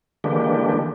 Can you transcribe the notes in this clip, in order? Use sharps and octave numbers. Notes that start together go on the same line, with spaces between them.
D3 E3 G#3 A#3 D4 G4